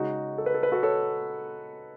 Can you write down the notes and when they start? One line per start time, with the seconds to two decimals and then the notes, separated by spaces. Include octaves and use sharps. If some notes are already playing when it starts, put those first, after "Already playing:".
Already playing: C#3 G#3 C#4 D#4 F#4
0.38 A4
0.46 B4
0.54 A4
0.63 B4
0.72 F#4 A4
0.83 A4 C#5